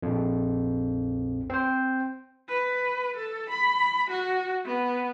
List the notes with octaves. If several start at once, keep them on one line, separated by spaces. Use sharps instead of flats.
A#1 F2
C4 C5
B4
A4
B5
F#4
B3